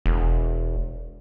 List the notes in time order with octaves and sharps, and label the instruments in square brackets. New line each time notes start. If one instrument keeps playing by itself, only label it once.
[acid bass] E1